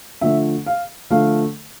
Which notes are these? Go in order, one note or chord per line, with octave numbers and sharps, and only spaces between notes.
D3 F3 A3 E5
F5
D3 F3 A3 F5